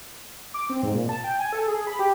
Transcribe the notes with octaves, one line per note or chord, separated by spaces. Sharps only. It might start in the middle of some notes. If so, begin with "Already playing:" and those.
D6
C4
G#2
A#2
A5
G5
G#5
A4
G#4
B5
G4